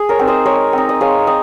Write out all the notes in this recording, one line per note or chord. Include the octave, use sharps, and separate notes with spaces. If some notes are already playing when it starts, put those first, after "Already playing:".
Already playing: G#4
A#4 C#5
C4 D#4
C5 D#5
G#3 A#4 C#5
C4 D#4
D#5
G#3 C#5 F5
C4 D#5